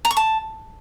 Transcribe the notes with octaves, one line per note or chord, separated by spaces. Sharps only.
A#5
C#6
A5